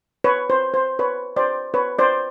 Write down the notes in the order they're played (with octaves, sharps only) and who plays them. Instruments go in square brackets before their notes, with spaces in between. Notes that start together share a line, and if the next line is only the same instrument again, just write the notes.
[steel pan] B4 C#5
C5
C5
B4 C#5
C5 D5
B4 C#5
C5 D5